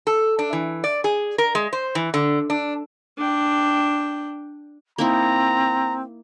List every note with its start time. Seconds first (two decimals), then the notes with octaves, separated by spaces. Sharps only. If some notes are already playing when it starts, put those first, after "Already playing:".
0.07 A4
0.39 D4
0.53 E3
0.84 D5
1.04 G#4
1.38 A#4
1.55 G#3
1.73 C5
1.95 E3
2.14 D3
2.50 D4
3.18 D4 G5
4.98 A#3 C4 D#4 E4 A#5